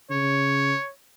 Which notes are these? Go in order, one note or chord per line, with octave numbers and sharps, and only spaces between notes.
C#3 C#5